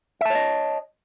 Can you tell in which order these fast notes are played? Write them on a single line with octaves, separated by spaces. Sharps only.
E5 A5 C#5 D#5